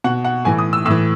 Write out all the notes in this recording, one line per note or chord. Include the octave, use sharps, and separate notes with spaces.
B2 F#5
F#5
A2 E3 G#5
D#6
E6
A2 E6
E3